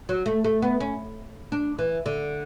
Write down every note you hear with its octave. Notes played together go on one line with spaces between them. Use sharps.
F#3
A3
A3
B3
C#4
D4
E3
D3